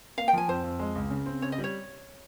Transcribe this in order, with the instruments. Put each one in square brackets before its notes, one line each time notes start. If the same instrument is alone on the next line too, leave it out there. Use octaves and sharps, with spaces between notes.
[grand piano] A#3 [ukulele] F5
[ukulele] G5
[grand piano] F3 [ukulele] G#5
[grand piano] F2 [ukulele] C5
[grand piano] F2
G#3
C#2
C#3
C4
[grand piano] C#3 [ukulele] C#5
[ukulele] D#5
[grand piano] G3
[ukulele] C#5